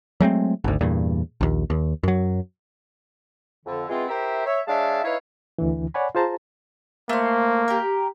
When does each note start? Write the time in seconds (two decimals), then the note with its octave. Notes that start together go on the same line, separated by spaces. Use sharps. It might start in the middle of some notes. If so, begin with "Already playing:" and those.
0.20 F#3 G#3 A3 C4
0.64 G#1 D2
0.81 E2 G2 A#2
1.41 A#1 D#2
1.70 D#2
2.03 F#2 F#3
3.66 F2 D3
3.89 E3 G#3 B3 C4 F4
4.09 E4 G4 A#4 C5 E5
4.46 C#5 E5
4.68 G#3 D4 C#5 E5 F5 A5
5.04 D#4 E4 B4 C#5 E5 F5
5.59 D2 D3 E3
5.94 C#5 D5 F#5 G#5 B5
6.15 F4 G#4 C5 A5 A#5
7.09 A3 A#3 C5
7.68 G4 A#4